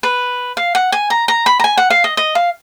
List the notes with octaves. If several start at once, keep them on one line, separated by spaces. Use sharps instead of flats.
B4
F5
F#5
G#5
A#5
A#5
B5
A#5
G#5
F#5
F5
D#5
D#5
F5